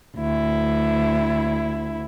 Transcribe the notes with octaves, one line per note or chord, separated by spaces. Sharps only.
D2 E4